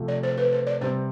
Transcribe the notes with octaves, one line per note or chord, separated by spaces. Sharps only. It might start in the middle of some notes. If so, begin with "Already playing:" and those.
Already playing: C3 F3 A3
D5
C5
B4
C5
D5
C3 G3 C4 C5